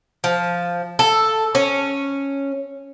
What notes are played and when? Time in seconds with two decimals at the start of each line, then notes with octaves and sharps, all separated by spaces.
0.24 F3
0.99 A4
1.55 C#4